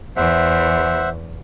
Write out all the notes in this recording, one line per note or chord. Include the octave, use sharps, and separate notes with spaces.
E2 C5 E5 F#5